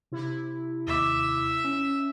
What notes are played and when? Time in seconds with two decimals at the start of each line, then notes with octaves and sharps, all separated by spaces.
0.12 C3 E4
0.87 D#2 E5 D6
1.65 C#4